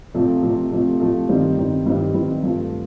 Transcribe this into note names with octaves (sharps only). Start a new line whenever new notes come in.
C3 F3 A3
C3 F3 A3
C3 F3 A3
C3 F3 A3
G2 D#3 G3 C4
G2 D#3 G3 C4
G2 D#3 G3 C4
G2 D#3 G3 C4
G2 F3 A3